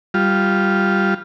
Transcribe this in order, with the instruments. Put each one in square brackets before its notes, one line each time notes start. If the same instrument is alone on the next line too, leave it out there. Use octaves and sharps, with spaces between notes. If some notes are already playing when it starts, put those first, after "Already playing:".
[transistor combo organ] G3 F4